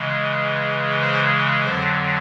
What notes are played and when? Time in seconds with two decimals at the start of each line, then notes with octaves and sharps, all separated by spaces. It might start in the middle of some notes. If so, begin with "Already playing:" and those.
Already playing: C#3 E3 G#3
1.01 C5
1.64 F2 D3 F#3 C5